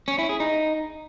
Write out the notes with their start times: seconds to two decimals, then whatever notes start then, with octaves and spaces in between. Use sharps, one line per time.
0.08 C#4
0.19 E4
0.29 G#4
0.40 D#4